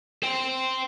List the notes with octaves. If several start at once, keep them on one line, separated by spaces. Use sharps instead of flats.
C5 G5